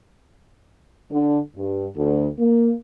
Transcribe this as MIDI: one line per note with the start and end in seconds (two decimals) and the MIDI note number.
1.12 1.39 50
1.56 1.87 43
1.96 2.27 38
2.39 2.72 58